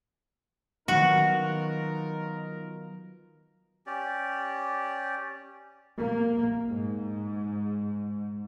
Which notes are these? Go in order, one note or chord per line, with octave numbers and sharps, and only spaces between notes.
D#3 F#3 B3 D#4 F4 F#4 A#4
C#4 G4 D5
A#3
G#2